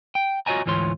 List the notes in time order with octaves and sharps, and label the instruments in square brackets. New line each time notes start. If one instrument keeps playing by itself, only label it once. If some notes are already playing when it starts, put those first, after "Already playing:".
[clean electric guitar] G5
F4 F#4 C#5 D#5 G#5 A#5
D2 G#2 E3 F4 C#5 C6